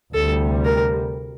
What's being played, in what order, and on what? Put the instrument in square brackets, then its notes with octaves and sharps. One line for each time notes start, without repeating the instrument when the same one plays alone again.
[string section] D2 C3 G3 [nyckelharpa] A4
[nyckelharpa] A#4